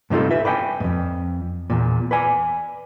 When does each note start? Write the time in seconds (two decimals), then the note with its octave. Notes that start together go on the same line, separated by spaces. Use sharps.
0.10 G2 C3 D#4 F4 A4
0.31 B4 E5
0.45 B4 D5 E5 G5 G#5
0.80 F2 G#2
1.70 E2 A#2
2.11 B4 D5 G#5